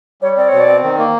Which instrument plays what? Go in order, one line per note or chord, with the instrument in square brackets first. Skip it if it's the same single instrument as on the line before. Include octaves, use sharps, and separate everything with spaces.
[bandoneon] G3 [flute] C#5
[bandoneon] C4 [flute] D5
[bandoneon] B2 [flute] C#5
[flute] D5
[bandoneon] C4
D#3
A#3